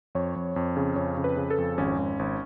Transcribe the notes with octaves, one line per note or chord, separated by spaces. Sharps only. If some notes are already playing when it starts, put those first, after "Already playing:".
F2 C#5
F2
F2
C#3
F2 C#5
C#3
B4
C#3
A4
F2
G#1 C#4
G#1
G#1